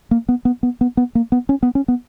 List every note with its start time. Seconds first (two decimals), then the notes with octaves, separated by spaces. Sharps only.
0.11 A#3
0.29 B3
0.45 B3
0.63 B3
0.81 B3
0.97 B3
1.15 A#3
1.32 B3
1.49 C#4
1.63 B3
1.75 C#4
1.88 B3